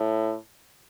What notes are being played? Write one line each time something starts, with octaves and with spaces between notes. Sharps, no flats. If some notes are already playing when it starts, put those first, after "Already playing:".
Already playing: A2